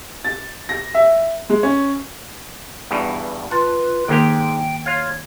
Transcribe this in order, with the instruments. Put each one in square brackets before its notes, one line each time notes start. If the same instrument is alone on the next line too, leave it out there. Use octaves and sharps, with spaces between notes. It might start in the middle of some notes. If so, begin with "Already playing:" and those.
[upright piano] A6
A#6
E5
G#3
C#4
[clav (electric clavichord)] E2 G2 B2
[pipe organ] F4 B4 [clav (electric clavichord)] A5 [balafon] C6
[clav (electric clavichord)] G#2 G#3 G4 [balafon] D#3 A#3 A#4 [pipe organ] G5
[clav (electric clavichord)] F4 F5 [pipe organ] C#5